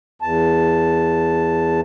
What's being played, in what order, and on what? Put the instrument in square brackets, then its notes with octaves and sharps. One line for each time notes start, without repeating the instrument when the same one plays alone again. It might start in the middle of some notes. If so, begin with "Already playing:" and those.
[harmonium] E2 A5